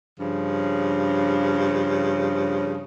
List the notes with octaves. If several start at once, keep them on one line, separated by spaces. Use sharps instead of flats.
G2 C#3 F3